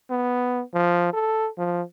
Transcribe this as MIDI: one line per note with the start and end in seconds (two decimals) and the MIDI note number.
0.10 0.62 59
0.74 1.13 53
1.13 1.48 69
1.58 1.82 53